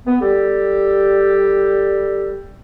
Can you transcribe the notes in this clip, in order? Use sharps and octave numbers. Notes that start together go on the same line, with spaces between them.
B3
G3 G4 A4